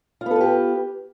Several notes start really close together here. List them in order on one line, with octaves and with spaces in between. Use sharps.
F4 B3 A4 B4 G4